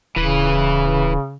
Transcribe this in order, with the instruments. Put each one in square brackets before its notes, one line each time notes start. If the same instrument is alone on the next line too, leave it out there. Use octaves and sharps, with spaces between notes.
[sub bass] D1 [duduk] C#3 [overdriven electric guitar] E3 B4